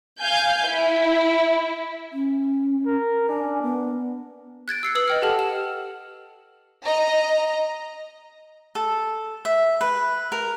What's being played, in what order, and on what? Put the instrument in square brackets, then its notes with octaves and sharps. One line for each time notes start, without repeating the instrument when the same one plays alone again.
[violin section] F5 G#5 G6
E4
[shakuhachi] C#4
[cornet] A#4
[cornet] D4 [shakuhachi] G#5
[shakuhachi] B3
[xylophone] F#6 G#6 A6 D7
E6 C7 C#7
B4 D#6 E6 F#7
D#5 G5 F6
G4 A4 F#5 A5 F6
E7
[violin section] D#5 A#5
[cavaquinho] A4
E5
B4
A#4